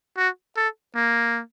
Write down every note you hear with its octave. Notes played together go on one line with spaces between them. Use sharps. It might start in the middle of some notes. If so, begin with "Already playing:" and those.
F#4
A4
A#3